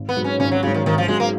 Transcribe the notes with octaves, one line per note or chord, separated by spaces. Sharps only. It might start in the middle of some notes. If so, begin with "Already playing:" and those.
Already playing: G#1
B3
G#2 F#3
C#4
G#1 C#4
F#3
G#2 C#3 F#3
D#3
G#1 D#3
F3
G#2 F#3 G#3
A#3